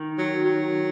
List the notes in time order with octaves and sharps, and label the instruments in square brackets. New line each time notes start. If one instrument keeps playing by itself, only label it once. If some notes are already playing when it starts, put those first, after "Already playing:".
Already playing: [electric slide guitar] D#3
[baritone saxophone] F#3
F#3